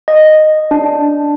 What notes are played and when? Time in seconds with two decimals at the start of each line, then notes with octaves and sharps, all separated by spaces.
0.08 D#5
0.71 D4